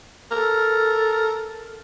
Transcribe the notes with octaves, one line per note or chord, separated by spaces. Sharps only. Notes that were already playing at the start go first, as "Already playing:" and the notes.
A4 A#4